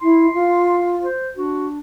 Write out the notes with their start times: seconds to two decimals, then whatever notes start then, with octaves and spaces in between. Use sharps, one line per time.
0.01 E4 C6
0.34 F4
1.03 C5
1.37 D4 F#4